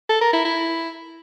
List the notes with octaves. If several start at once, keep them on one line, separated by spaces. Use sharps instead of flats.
A4
A#4
E4
E4